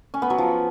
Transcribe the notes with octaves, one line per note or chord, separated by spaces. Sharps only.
C#4
B3
F#3
F3